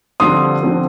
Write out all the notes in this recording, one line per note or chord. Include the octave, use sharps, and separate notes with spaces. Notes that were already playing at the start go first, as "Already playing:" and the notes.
G2 D3 F3 C4 C6 D#6
D3 F3 C4